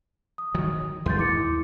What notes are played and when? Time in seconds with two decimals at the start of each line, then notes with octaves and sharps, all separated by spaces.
0.38 D#6
0.55 D#3 F#3
1.06 D#2 G#3 C6 G6 A6
1.17 E4 D6 C#7